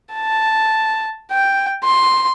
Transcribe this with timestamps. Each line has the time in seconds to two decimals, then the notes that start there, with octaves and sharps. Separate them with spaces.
0.14 A5
1.31 G5
1.84 C6